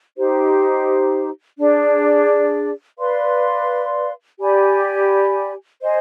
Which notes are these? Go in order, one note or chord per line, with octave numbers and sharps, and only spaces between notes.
D#4 G4 C5
D4 G#4 D5
B4 D5 F5 C6
G4 D5 G#5 B5
C5 D#5 G#5